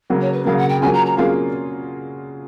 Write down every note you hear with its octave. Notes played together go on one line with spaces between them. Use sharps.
C#3 F#3 A#3
C#5
B4
C#3 F#3 A#3 F5
F#5
G5
F#3 A#3 C#4 F4 G#4 G#5
A#5
A#5
F#3 A#3 C#4 F4 G#4 F5